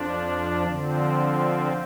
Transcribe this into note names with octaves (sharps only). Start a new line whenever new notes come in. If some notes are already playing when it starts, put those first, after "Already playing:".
Already playing: F2 F3 D4
D3 F3 C4